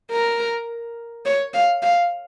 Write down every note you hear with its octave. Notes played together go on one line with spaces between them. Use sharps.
A#4
C#5
F5
F5